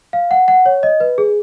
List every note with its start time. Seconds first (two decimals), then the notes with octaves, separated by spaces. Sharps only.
0.13 F5
0.31 F#5
0.48 F#5
0.66 C#5
0.83 D#5
1.00 B4
1.18 G#4